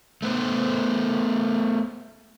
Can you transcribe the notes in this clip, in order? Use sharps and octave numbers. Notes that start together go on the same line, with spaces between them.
A3 B3 B4 C5